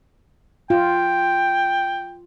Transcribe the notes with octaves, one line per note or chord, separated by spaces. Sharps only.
F4 G5